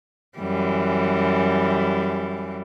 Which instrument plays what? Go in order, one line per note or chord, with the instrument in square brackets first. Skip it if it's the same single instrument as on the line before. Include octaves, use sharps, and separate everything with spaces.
[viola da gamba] F#2 E3 G3